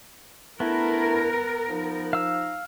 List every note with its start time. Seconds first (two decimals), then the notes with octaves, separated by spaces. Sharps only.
0.60 A3 B3 D4 E4 A#4
1.68 F3 D#4
2.13 F5 E6